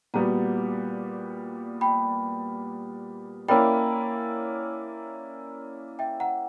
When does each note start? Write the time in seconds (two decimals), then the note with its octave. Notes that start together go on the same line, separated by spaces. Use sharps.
0.14 A#2 G3 B3 F#4 F#5 A#5
1.81 G5 B5
3.48 A#3 C#4 E4 A#4 D5 G5 B5
5.99 E5 G5
6.20 F#5 A#5